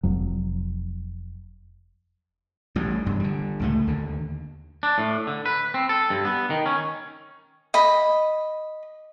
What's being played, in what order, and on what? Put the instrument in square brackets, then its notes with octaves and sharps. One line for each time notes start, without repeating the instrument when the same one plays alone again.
[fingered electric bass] F1 F2 F#3
[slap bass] A1 A2 G3
E1 G2
D3 G3
C#2 A2 A3
D#2 D3
[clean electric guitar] D4
A2
D3
B4
C4
A4
G2
B3
D#3
C#4
[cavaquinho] D#5 B5